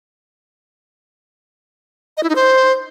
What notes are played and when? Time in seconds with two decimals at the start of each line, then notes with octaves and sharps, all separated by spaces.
2.17 D#5
2.23 E4
2.29 D#4
2.36 C5